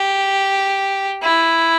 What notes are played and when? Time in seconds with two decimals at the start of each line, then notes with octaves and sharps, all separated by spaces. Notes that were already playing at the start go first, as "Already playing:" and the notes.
Already playing: G4
1.23 E4